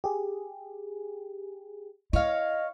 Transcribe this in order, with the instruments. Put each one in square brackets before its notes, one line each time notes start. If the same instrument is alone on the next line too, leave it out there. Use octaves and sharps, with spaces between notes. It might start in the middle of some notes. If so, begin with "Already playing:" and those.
[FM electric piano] G4 G#4
[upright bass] E4 [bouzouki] C#5 F5 [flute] D#5